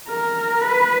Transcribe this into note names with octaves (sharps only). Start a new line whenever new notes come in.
A#4
B4